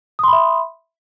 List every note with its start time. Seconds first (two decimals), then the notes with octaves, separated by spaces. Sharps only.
0.19 D#6
0.24 C6
0.28 B5
0.33 E5